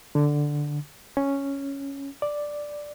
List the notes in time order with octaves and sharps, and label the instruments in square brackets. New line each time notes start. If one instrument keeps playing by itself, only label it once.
[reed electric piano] D3
C#4
D5